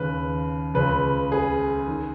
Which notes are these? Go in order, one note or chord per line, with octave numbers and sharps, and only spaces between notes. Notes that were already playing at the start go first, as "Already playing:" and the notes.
Already playing: D#2 C#3 B4
C#2 C#3 B4
G#4
D#3